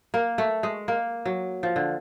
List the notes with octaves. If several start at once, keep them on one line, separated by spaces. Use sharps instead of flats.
A#3
A3
G#3
A#3
F#3
F3
D3